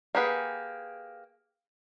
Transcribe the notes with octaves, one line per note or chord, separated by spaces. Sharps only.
A#3 G4 G#4 B4 F#5